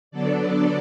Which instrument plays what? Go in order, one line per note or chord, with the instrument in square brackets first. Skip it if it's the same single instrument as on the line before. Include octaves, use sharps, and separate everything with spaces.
[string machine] D3 F#3 B3 D4 A4 D5